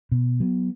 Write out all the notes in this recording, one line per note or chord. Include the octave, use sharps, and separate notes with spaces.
B2
F#3 B3